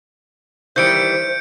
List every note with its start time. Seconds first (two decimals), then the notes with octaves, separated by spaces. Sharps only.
0.76 D#3 E3 G3 C5 G6 C#7 D7